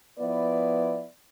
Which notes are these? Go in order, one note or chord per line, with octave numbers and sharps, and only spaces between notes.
F3 B3 E4 B4 D5